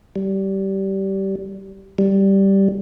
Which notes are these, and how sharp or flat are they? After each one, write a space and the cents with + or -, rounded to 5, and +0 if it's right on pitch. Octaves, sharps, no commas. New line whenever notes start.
G3 -20
G3 -5